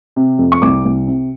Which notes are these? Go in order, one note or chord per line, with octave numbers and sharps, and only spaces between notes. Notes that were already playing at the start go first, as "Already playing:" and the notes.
C3
F2
C#6
C2 D6
C2
C3